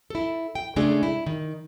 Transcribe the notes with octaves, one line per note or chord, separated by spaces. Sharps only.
E4 A4
G5
C#3 G#3 A3 D4 G#4
E4
D#3